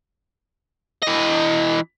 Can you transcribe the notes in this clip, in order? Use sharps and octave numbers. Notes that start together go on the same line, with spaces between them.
E3 D#5